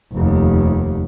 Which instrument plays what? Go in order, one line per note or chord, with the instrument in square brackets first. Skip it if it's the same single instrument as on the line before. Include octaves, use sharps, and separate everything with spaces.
[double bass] F1 D#2